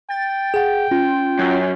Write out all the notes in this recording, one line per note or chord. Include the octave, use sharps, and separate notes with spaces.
G5 A6
G#4 F#5
C#4 F4
F#2